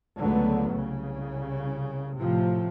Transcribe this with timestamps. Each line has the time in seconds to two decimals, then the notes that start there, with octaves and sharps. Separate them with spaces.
0.19 C#2 D3 F#3 A3 B3
0.73 C2 C#3
2.18 A2 C3 F3